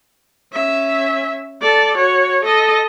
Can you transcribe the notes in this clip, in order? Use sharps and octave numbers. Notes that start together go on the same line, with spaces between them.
C#4 E5
A4 D5
F#4 C#5
A4 D#5